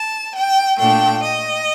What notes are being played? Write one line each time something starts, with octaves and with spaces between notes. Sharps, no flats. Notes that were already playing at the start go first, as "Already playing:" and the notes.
Already playing: A5
G5
A#2 A3 D4 G5
D#5